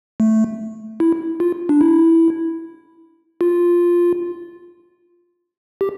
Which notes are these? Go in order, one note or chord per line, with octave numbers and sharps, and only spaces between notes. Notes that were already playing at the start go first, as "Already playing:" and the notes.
A3
E4
F4
D4
E4
F4
G4